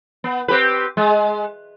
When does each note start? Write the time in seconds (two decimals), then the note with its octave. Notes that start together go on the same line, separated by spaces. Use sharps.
0.24 B3
0.48 C4 G4 B4
0.97 G#3